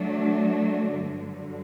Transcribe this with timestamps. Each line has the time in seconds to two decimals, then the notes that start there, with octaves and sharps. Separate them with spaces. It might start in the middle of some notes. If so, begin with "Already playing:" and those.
Already playing: F#3 A3 D4
0.92 G2 D3 F#3